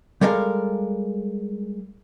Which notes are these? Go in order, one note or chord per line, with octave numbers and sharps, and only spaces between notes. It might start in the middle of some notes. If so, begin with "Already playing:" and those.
G3 G#3 A4 A#4 E5 F5